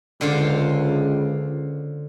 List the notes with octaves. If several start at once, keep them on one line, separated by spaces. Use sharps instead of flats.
C#2 D3 F4 C5